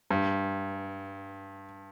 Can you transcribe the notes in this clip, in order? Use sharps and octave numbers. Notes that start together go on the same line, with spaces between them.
G2